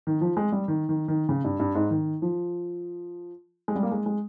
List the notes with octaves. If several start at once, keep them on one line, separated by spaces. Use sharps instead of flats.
D#3
F3
G#3
G3
D#3
D#3
D#3
C#3
G2
G2
G#2
D#3
F3
G#3
G3
A#3
G#3
G#3